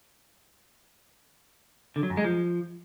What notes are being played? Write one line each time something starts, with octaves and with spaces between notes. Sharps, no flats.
D3
F#3
F#2
G#3
F3